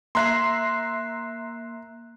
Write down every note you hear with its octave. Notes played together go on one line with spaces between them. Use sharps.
A#3 E5 A#5 C6 F#6 C7